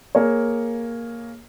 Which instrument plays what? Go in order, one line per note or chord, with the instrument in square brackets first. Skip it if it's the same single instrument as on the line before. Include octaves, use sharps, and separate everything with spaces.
[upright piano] A#3 G#4 C#5